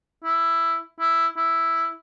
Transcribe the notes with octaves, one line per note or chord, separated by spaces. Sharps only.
E4
E4
E4